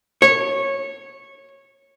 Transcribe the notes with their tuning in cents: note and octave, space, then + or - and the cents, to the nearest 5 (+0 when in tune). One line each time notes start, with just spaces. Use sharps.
C#5 -15